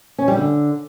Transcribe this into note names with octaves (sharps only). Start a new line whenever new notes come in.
C#4
G3
D3